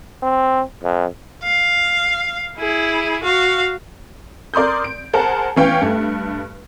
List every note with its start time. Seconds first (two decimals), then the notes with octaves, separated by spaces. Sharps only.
0.23 C4
0.84 F2
1.44 F5
2.58 E4 G#4
3.24 F#4 F5
4.54 A#4 D5 C6 D#6 G6
4.84 D7
5.13 G#4 A#4 C5 F#5 A5 A#5
5.56 E3 B3 C#4 F5 G5
5.81 G2 A3